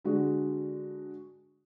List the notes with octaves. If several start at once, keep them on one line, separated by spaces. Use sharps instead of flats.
D3 G#3 F#4